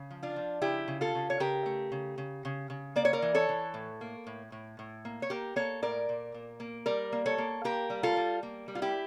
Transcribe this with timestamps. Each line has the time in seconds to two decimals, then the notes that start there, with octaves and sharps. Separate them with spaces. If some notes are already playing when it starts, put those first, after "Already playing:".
Already playing: C#3
0.11 F3
0.23 D4 F4
0.36 F3
0.62 C#3 E4 G4
0.88 C#3
1.01 F4 A4
1.15 C#3
1.30 C#5
1.40 C#3 G4 A#4
1.66 A3
1.92 C#3
2.18 C#3
2.45 C#3
2.70 C#3
2.96 A#3 D5
3.05 C#5
3.13 A#4 D5
3.22 E3
3.35 A4 C#5
3.49 E3
3.74 A2
4.01 A#3
4.27 A2
4.52 A2
4.79 A2
5.05 A#3
5.22 C#5
5.30 A#3 G4 A#4
5.56 A#3 A4 C#5
5.82 A2 A#4 D5
6.09 A#2
6.34 A#2
6.60 A#3
6.86 G3 A#4 D5
7.12 A#3
7.26 A4 C#5
7.38 A#3
7.64 A#3 G4 A#4
7.90 G3
8.03 F4 A4
8.17 G3
8.43 A#3
8.68 G3
8.75 F4
8.82 E4 G4